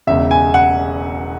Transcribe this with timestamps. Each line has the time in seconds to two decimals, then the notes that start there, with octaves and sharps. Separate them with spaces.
0.07 E1 E2 C#3 E5
0.31 G#5
0.54 F#5